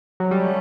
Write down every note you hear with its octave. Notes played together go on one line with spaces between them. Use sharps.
F#3
G3 A3 C#4